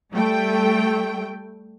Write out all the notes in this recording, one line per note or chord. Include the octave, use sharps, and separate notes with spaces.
G3 A3 G5